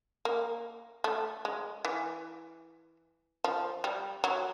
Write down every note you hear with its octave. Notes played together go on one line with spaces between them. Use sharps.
A#3
A3
G#3
E3
F3
G3
F#3